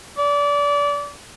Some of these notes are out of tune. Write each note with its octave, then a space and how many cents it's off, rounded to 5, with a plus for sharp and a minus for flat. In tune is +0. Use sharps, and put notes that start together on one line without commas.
D5 -25